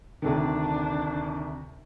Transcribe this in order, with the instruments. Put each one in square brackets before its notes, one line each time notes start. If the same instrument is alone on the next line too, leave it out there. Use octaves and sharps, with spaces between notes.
[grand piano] D2 C3 D#3 [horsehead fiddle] D4